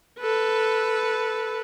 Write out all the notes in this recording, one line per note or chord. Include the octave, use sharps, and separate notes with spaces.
A4 B4